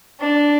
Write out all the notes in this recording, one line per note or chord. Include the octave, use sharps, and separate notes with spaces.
D4